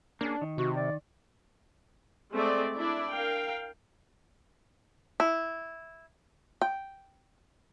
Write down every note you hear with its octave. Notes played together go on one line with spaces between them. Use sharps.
A#3 C#4 D4 G#4
D#3
C3 F#4
D5
G#3 A3 C4 D5
D4 E4 D5
A#4 F5 G5
E4
G5